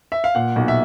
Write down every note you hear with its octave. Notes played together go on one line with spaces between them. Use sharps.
E5
F5
A#2 F#5
B1
E5